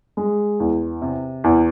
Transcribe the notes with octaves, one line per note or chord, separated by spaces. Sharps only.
G#3
E2
C3
E2